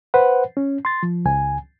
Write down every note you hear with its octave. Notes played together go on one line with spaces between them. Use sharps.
B4 C5 F#5
C#4
C6 A6
F3
C#2 G#5